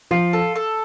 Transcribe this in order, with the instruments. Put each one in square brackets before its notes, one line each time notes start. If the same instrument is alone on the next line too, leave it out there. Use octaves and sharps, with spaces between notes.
[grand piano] F3 [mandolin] F4
[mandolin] A4
A4